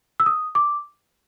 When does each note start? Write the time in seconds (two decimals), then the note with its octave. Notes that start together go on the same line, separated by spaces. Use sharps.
0.20 E6
0.26 D#6
0.55 D6